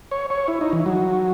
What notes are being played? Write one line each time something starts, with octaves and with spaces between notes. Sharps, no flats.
C#5
C#5
E4
D#4
E3
F#3